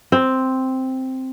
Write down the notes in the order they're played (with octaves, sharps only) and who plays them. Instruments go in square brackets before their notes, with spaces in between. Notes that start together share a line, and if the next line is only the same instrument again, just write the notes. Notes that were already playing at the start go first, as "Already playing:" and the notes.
[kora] C4